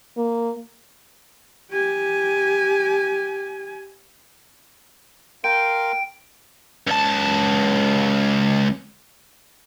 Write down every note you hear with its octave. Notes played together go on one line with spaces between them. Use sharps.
A#3
G4 G#5
A#4 F5 G5 C6 D7
C#2 A5